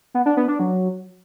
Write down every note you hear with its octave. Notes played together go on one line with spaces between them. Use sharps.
B3
D4
B3
D4
F#3